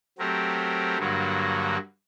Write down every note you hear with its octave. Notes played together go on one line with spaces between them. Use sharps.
F#3 A3 C4 G4 A#4
G2 D3 F#3 A#3 F#4